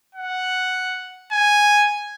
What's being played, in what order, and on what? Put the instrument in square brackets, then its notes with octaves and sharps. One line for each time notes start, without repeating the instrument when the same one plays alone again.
[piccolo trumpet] F#5
G#5